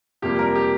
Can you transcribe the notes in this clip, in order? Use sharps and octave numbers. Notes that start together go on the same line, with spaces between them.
F2 C3 G3 A#3 G4
A#4
G4